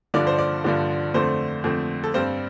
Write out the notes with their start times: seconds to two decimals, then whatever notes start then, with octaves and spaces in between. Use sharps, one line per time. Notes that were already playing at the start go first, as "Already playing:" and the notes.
0.14 G2 D3 F3 D4 D5
0.27 C5
0.38 D5
0.64 G2 D3 F3 D4
1.14 F2 D3 A3 C4 C5
1.64 F2 D3 A3 C4
2.04 A4
2.14 G2 G3 C4 C5